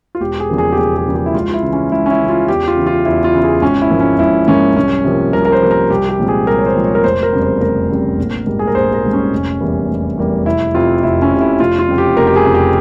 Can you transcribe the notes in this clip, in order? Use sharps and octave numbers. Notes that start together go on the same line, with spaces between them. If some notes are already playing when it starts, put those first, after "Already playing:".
F4
E1 G4
G#4
E2 C#3 F3 A#3
G#4
G4
E1 G#4
G#4
E2 C#3 F3 A#3
G4
E4
C#2 F4
F4
E4
C#3 E3
C#4
C#2 E4
C#4
E4
C#3 E3
F4
E2 G4
F4
C#3 E3
F4
E2 E4
F4
C#3 E3
G#4
G#1 C#4
E4
G#2 F3 A#3
C#4
G#1 E4
G#2 F3 A#3 C#4
C2 C#4
C3 F3 A#3
C2 A#4
A#4
C5
C3 F3 A#3
A#4
C2 G4
G4
A#2 F3 G#3 C4
G#4
C2 A#4
C#5
C5
A#2 F3 G#3 C4
C#5
A#4
F1 C5
A#4
E2 C#3 G3 C4
C5
F1 A#4
E2 C#3 G3 C4
A#1
G#2 G3 A#3
G#4
A#4
A#1 C5
A#4
G#2 G3 A#3
C#4
F1
E2 E3 G3 A#3
F1
E2 E3 G3 A#3
F1 E4
F2 C3 F4
F1 E4
C#4
F2 C3
E4
F1 F4
F4
F2 C#3
G4
F1 A#4
G4
G#4
F2 C#3
G4